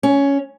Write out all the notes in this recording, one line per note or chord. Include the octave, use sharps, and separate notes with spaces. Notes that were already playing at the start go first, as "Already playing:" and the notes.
C#4